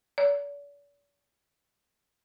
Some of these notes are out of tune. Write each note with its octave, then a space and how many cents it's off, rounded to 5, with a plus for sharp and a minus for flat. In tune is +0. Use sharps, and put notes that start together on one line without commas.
D5 -45